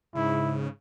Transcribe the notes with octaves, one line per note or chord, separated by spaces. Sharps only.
G#2 C#3 E4